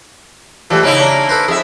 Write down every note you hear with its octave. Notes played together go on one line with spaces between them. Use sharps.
E3 F3 G3 A3
C#3 A#3 D#4 E4
C#4 D4 A#5
A4 B4 C5
F2 G#4 E5